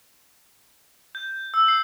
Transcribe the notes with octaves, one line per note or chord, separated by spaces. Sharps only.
G6
E6
C7